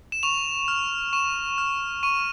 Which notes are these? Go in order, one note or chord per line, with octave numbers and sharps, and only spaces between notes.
E7
C#6 F7
F6
C#6 E7
F6
C#6 D#7